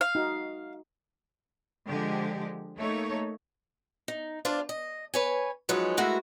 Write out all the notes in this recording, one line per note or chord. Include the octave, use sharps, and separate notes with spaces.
F5
D#4 F#4
D3 F3 G#3 G4
A3 A#3 D#4 A4 C#5
D#4
D4 F4 C5 D5
D#5
B4 C#5 G#5
F3 F#3 G#3 D#4 B4 C#5
G#3 A3 E4 F#4 A#4 B4